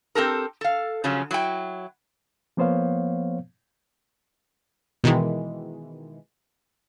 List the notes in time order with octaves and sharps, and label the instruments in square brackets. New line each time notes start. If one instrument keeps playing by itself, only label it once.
[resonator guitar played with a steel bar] C4 G4 A4 A#4
A4 F5
C#3 F3 F#3 C#4
F#3 E4 G5
[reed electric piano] F3 A#3 B3 C5 C#5 F5
[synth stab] B2 D#3 E3 G#3